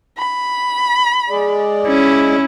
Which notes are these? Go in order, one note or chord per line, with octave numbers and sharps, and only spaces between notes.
B5
G#3 G#4 D5
C#4 E4